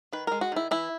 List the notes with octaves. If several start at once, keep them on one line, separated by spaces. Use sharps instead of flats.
D#3 B4
G#3 A#4
F#4
D#3 E4
E3 E4